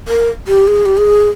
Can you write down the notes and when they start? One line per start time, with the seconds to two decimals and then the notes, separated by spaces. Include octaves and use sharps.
0.08 A#4
0.48 G4
0.68 G#4
0.86 G4
0.97 G#4